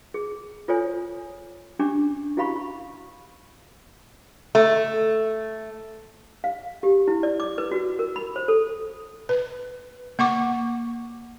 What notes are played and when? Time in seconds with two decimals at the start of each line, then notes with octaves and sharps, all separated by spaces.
0.14 G#4
0.68 F4 A4 C5 C#5 G#5
1.79 C#4 D4 G4 D6
2.37 E4 F#4 G4 F5 B5 C#6
4.55 A3
6.44 F5
6.83 G4
7.08 E4
7.23 D5
7.40 D6
7.58 B4
7.72 F#4
7.99 A#4
8.16 B5
8.36 C5
8.48 A4
9.29 B4
10.19 A#3 F#5 C#6 D6